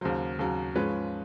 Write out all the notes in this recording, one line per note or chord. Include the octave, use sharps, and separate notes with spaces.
D#2 C#3 F#3 C5
D#2 C#3 F#3
G#2 F3 G#3 C#4 B4